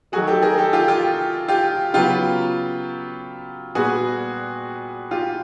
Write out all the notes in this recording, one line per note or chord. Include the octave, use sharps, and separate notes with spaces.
D#3 F#3 A3 F#4 G#4
G4 A4
G#4 A#4
G4 A4
F4 G4
F4 G4
F4 G4
C#3 F#3 B3 F4 G4
A#2 G3 B3 F#4 G#4
F4 G4